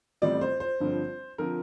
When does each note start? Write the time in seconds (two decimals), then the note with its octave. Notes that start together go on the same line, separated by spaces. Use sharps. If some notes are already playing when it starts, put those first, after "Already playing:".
0.22 A1 A2 G3 C4 D5
0.41 C5
0.60 C5
0.80 G1 G2 D3 F3 C4
1.38 D3 F3 C4 A#4